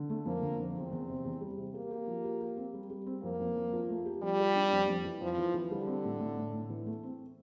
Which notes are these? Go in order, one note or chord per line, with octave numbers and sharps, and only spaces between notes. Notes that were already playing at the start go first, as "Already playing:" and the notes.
Already playing: D3
A3
F2 A#3
D3
F2
E2 C4
E2
C3
E2
G3
C3
A#3 G4
G4
F3
G4
G4
C4
G3
G3
C4
F2 A#3
F2
F2
F3
A3
G4
F3 G3
G4
D4
F2
F2
E3
F2 F3
E3
E3
D3 G3
C4
A2
A2
A2
A2
E3
A3
C4